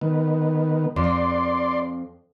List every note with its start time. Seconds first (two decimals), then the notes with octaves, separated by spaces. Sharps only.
0.01 D#3 B3
0.96 F2 D5 C6